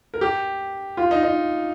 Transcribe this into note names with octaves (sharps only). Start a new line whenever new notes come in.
A#4
G4
F4
D#4
D#4